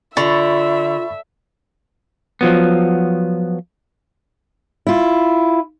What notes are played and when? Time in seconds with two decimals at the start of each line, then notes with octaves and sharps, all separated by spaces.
0.17 D3 F4 E5 B5 C#6 A6
2.41 F3 F#3 B3
4.87 E4 F4